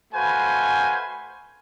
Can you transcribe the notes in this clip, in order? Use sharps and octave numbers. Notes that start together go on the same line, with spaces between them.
A3 F#4 B4 C5 F5 G#5